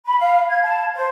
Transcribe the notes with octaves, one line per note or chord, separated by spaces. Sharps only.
B5
F5
G#6
A5
C5